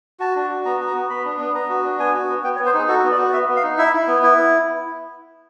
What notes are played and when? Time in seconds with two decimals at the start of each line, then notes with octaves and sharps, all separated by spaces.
0.20 F#4 A5
0.36 D4
0.50 F#4
0.65 B3 A#5
0.80 F#4
0.87 A#5
0.95 B3
1.09 B3 B5
1.25 D4
1.40 B3
1.54 B3 A#5
1.69 F#4
1.84 D4
1.99 B3 G#5
2.14 F#4
2.29 B3
2.43 B3 G5
2.56 C#5
2.59 B3
2.66 C5
2.74 D#4 G#4
2.88 F#4 A4
3.04 B3
3.11 D5
3.18 F#4
3.33 B3 E5
3.49 B3
3.56 F5
3.63 D#4
3.78 E4 E5
3.93 E4
4.07 B3
4.23 E4